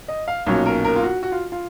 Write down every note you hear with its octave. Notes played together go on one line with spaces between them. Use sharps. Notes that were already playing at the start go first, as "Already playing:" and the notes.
D#5
F5
B1 A#2 F#3 C#4 C#5
A#4
A#4
F4
F#4
F#4
F4
F4